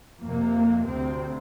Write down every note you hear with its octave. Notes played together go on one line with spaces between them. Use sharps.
F2 C3 A#3
D2 C3 C4